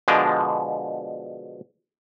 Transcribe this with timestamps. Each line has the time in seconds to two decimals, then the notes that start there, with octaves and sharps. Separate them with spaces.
0.08 B2 D3 F3 G#3 D4